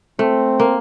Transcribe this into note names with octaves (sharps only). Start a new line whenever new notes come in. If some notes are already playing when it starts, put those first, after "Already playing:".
A3 C4
A#3